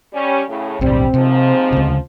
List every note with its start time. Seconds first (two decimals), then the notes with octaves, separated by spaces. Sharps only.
0.13 G3 C#4
0.49 A2 C#3
0.81 D1 B1 G3 C4
1.14 D#2 G#2 C3 F3
1.73 D2 C#3